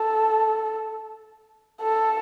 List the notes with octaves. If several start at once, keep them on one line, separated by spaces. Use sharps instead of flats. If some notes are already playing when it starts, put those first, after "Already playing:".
Already playing: A4
A4